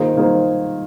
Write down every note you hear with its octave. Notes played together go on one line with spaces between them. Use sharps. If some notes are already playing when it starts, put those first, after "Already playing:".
Already playing: D#3 A#3 F4 G#4 C5
D#3 A#3 F4 G#4 C5